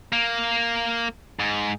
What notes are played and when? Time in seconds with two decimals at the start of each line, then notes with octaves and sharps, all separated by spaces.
0.12 A#3
1.39 G#2